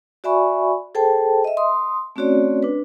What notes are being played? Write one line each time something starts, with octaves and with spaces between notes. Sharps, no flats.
F#4 D5 E5 G#5 B5 C#6
G#4 A4 C5 G5 A5
D#5 E5
C6 D#6
A3 C4 C#4 F#4 C#5 D5
D4 B4